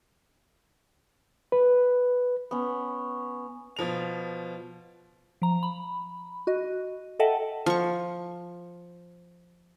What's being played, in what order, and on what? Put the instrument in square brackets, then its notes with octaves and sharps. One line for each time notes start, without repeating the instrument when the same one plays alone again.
[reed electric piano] B4
[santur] B3 C#4
[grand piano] B2 F3 F7
[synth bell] F3 A#5
B5
F#4 D#5
A4 D#5 E5 F#5 G5 A5
[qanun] F3 C#6